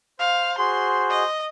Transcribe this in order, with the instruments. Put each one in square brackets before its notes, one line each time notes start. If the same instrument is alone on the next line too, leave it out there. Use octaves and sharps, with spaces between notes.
[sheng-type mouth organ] C5 [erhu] F5
[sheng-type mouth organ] F#4 G#4 [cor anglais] C5 [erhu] C6
[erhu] D#5